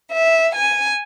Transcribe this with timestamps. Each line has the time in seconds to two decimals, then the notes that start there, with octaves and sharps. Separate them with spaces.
0.12 E5
0.55 G#5